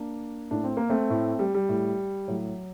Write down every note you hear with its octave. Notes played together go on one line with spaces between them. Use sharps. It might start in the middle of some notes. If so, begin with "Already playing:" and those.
Already playing: A#3 D4
A2 D4
C4
A#3
A3 C4
A2
G3
G3
A2
A2 F#3